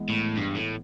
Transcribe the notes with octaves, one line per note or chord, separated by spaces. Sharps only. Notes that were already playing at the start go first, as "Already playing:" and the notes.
Already playing: E3 G#3 B3
A2
G2
A2